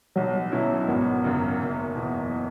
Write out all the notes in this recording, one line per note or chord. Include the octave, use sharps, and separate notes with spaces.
B1 F#3
B2 F#3 C#4 E4
G#1 B3
F#2 C#3 F#3
F#1
E2 B2